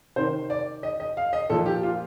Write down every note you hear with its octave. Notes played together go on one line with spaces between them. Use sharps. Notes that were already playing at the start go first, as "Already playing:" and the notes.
C3 D#3 C5
D5
D#5
D#5
F5
D#5
A#2 F3 A4
G4
F4